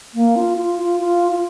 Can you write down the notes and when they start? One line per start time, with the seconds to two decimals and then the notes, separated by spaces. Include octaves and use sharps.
0.14 A#3
0.36 F4
0.57 F4
0.79 F4
1.00 F4
1.32 F4